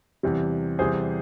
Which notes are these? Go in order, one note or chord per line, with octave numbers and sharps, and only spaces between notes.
E2 C3 G3
E2 C3 G3 G#4 C5